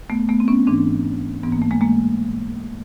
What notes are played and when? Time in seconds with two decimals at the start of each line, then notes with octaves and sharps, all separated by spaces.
0.10 A3 B3
0.29 A3 B3
0.40 C4
0.48 B3 C#4
0.67 G#2 E3 C4 D4
1.43 G#2 E3 B3
1.52 A#3
1.62 A3
1.71 G#3 A#3
1.81 G#3 A#3